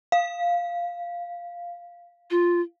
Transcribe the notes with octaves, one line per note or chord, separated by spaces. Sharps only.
F5
F4